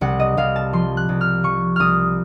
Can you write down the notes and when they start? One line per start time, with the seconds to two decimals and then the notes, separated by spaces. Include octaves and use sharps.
0.01 C2 F#5
0.19 D#5
0.37 C2 F5
0.56 A5
0.73 F3 C6
0.97 F#6
1.09 C2
1.21 F6
1.43 F3 C#6
1.76 C2 D#6 F6